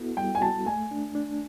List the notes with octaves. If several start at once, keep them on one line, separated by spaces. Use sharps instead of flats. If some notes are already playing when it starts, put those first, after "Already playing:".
Already playing: B3 E4 F#4 A4
G3 G5
G#5
F#4 A5
A3 G#5
D4
D4